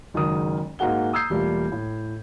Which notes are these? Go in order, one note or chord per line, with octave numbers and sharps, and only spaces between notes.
F#1 D#3 G#3 F#4 A#4 D#6
G#2 A#3 F#4 G#4 F#5 G7
A#5 D#6 E6 G6 G#6 C7
E1 G3 A3 A#3 F4
A2